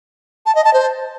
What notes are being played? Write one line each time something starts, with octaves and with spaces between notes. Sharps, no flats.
A5
D#5
A5
C5